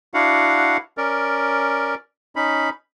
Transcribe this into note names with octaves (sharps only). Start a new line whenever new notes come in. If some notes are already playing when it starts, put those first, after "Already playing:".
D4 E4 F#4 F5 F#5
C#4 A#4 D5
C#4 D#4 B5